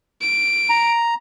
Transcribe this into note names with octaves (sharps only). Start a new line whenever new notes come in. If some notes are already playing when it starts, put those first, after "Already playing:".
D7
A#5